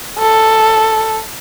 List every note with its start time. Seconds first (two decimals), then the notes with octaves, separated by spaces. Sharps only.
0.19 A4